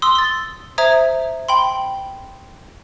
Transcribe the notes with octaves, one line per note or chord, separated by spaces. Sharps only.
C6 D#6 E6
C6 A6
C5 E5 A#5 D#6 G#6
G5 B5 C6